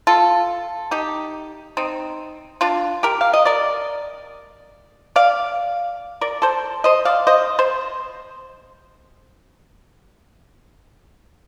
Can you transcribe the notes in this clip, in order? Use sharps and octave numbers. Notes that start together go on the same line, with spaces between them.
F4 A4
D#4 G4
C4 D#4
D4 F4
G4 A#4
F5
D#5
A#4 D5
D5 F5
A#4 D5
A4 C5
C5 D#5
D5 F5
C5 D#5
C5